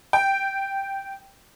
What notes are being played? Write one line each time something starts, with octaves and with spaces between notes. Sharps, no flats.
G5